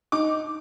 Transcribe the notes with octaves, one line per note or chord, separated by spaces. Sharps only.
D#4 D6